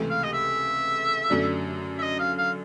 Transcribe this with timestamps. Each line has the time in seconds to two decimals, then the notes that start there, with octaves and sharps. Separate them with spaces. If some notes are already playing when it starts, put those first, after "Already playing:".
Already playing: C#2 C3 E3 A3
0.10 F5
0.23 D#5
0.33 E5
1.30 F#2 D3 F#3 A3 D4
1.98 E5
2.02 D#5
2.19 F5
2.38 F5